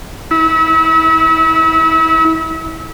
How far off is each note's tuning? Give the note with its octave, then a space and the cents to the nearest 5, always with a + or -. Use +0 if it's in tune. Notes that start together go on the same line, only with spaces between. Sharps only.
E4 -30